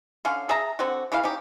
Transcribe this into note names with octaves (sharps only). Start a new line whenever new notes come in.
D3 C#4 F5
G#4 E5 A5 A#5
D3 C4 F#4
C#3 E3 E4 F5
C#4 D#4 G4